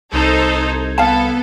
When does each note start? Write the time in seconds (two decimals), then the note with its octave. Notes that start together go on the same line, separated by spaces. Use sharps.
0.12 C2 D#4 A4 C5 G#6
0.98 B3 A4 F5 A5